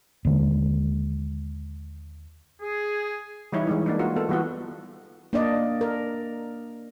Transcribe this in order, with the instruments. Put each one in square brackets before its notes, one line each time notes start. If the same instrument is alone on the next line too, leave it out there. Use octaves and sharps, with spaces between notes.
[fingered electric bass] D#2 D3 G#3
[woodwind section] G#4
[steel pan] E3 G3 D#4 E4 C#5
E3 G#3 D#4
A#3 D4 D#4
F4 F#4 A#4
B3 A4
E3 G3 B3 F4 F#4
[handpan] A#3 D4 D5 D#5
A#4